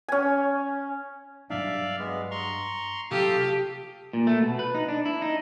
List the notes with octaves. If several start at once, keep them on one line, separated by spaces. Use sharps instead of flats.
C#4 G#5
G2 F#3 D4 D5 E5 F5
G#3 B3
A#5 C6 C#6
C3 F#3 G4 A4 F5 D#6
A#2
A3
B2
B4
D#4
D4
E4
D#4